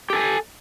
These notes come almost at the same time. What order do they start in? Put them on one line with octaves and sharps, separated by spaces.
G4 A4 G#5